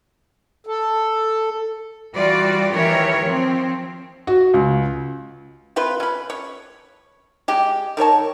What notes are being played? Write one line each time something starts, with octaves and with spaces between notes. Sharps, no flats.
A4
E3 G3 F4 F#4 D5
D#3 E3 G4 A#4 C#5
F3 C4
F#4
C#2
C3 F4 B4 C6
C#4 B5
C#5
G#3 G4
D#3 A#4 C#5 A5